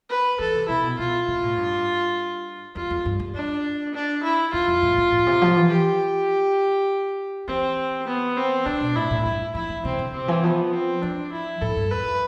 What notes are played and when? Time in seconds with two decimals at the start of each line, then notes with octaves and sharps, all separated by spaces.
0.10 B4
0.39 E3 A4
0.54 C3
0.68 C3 E4
0.83 B2
0.99 B2 F4
1.28 C3
1.43 A2
1.57 G2
2.76 F2 F4
2.90 F2
3.06 G2
3.20 G2
3.34 D4
3.94 D4
4.23 E4
4.53 F2 F4
4.68 F2
4.82 A2
4.98 F2
5.12 A2
5.27 C3
5.42 F3
5.56 E3
5.71 G4
7.48 E3 C4
8.07 B3
8.37 C4
8.66 D3 D4
8.81 B2
8.95 A2 E4
9.11 A2
9.25 G2 E4
9.55 F3 E4
9.69 E3
9.85 C3 C4
9.99 D3
10.14 C3 C4
10.28 E3
10.43 F3 B3
10.73 C4
11.02 F3 D4
11.32 E4
11.61 A2 A4
11.76 G2
11.91 F2 B4